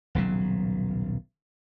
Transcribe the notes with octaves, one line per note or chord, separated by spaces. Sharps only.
D#1 B1 C#3 F#3